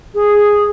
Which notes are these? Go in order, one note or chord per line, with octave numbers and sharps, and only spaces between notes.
G#4